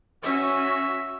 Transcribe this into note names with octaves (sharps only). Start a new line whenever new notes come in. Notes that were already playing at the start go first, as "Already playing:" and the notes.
C#4 F#4 E5